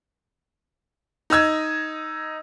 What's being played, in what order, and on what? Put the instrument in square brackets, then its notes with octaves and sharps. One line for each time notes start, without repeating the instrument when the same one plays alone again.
[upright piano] D#4 D#5 E6 G#6